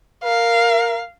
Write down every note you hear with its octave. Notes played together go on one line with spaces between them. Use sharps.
A#4 F5